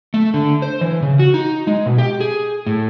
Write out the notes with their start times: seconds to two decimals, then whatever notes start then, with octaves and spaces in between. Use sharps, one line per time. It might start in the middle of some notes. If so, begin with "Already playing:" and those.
0.14 A3
0.34 D3
0.62 C5
0.81 E3
1.02 C#3
1.19 F#4
1.34 D#4
1.67 G#3
1.86 B2
1.98 G4
2.20 G#4
2.66 A2